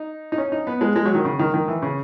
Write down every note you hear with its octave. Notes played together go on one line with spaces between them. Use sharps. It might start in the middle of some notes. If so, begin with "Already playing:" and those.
Already playing: D#4
D#4
C#4
D#4
B3
G#3
G#3
F#3
D#3
C#3
D#3
D#3
E3
C#3